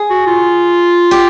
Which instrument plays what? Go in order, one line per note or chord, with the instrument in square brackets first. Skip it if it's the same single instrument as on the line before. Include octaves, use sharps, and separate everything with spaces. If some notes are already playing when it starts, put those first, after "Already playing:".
Already playing: [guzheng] G#4
[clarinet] F#4
F4
[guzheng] G4